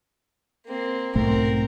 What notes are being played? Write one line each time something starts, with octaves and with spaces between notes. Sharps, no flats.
A#3 C4
B1 G#2 A3 C4 A#4